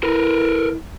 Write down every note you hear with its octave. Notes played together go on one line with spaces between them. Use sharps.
E4 A#4 B4